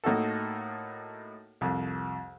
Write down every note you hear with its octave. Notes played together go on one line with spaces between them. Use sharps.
A2 A#3 D#4 F#4 A4
C2 F2